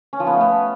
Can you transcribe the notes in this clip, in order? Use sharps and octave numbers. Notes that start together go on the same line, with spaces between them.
C#4
F3
B3
A3
B3